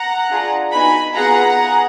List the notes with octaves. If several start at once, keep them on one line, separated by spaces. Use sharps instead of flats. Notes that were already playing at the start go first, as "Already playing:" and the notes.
Already playing: F#5 A#5
D4 F4 G#4
B3 D#4 F#4 G#5 B5
B3 F4 G#4 F#5 A#5
G#4